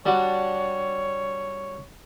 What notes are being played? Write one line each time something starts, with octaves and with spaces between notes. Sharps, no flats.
G3 D4 F#4 C#5